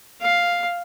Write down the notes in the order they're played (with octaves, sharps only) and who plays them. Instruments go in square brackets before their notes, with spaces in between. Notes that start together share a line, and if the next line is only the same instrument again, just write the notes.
[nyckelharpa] F5